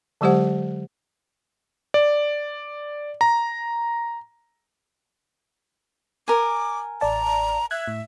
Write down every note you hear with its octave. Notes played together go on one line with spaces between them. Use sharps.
D3 F#3 G#3 G4 C5 F#5
D5
A#5
A#4 G#5 D6
A1 D5 A5 A#5
E5 F#6 G#6
A2